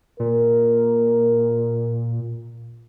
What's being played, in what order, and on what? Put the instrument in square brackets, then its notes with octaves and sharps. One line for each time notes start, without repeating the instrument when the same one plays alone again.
[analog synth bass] A#2 [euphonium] A#4